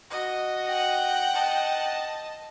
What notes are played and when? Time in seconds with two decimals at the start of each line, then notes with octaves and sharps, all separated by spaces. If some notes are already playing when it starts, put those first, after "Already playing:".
0.10 F#4 D#5
0.68 F#5 G5
1.34 D#5 A5